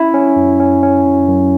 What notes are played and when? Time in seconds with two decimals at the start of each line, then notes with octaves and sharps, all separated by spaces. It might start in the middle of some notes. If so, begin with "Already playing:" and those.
Already playing: C#4 E4
0.14 C#4
0.36 F#2
0.60 C#4
0.83 C#4
1.06 F#2
1.29 F#2